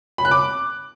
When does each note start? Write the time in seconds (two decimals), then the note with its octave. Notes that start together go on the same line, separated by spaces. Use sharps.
0.18 B5
0.25 F#6
0.31 D6